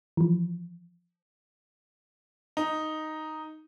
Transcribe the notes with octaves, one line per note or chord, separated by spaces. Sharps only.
E3 F3
D#4